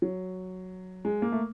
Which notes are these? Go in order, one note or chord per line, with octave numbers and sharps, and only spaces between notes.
F#3
G#3
A#3
A3